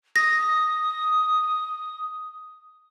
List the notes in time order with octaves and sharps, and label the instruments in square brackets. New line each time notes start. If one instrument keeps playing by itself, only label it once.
[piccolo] D#6 [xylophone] A#6